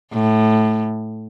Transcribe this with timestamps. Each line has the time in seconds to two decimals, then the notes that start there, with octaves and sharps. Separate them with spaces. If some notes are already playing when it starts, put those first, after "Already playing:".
0.13 A2